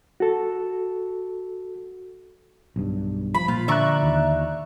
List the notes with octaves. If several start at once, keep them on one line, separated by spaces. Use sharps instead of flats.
F#4 A4
B1 G2
F3 B5
A#2 F4
D3 D5 E5 A#5 C#6 F#6
D#2